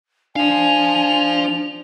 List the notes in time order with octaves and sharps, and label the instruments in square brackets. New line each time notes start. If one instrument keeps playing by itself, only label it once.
[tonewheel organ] D4 [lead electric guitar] C5 F5 [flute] G#5 [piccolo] F7